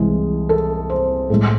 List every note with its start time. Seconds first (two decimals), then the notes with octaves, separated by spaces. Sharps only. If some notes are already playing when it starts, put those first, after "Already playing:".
Already playing: C2 C3 E3 G#3 G#4
0.49 A4
0.90 C5
1.30 A2 G#3